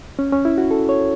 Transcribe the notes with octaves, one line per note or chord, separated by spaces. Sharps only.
C#4
C#4
E4
F#4
A4
C#5